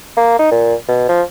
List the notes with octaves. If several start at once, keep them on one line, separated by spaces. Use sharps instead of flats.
A#3
D#4
A#2
B2
F3